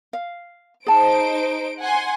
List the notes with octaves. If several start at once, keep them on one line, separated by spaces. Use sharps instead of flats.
F5
D#4 G#4 C5 A5 D7
F#5 G#5 C6